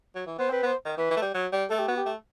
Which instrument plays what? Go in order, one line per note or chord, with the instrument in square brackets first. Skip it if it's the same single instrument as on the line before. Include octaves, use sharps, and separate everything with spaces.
[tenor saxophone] F#3
E3
[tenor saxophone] B3 [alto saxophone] C5
[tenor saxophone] C4 [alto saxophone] B4
[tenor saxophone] B3 [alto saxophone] C5
[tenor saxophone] D#3
[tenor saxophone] E3 [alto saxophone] B4
[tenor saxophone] E3
A3
G3
F#3
G3
[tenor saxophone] A3 [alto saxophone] A4
[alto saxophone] G4
[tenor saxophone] B3 [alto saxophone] F#4
[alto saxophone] G4
[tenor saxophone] A3